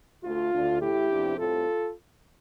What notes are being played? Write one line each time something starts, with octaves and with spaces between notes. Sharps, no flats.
D2 D3 A3 F4
D2 D3 A3 D4
A2 E3 A3 E4 G4
F2 C3 F3 B3 D4
A2 G3 C4 F4 A4